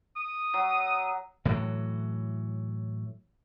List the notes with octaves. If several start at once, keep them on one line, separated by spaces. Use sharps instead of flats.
D#6
F#3
A2 E3 F#3